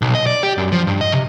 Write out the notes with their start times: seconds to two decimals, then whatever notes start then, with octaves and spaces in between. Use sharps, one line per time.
0.02 B1
0.15 D#5
0.27 D5
0.43 G4
0.58 F#2
0.72 F3
0.87 G2
1.01 D#5
1.12 C3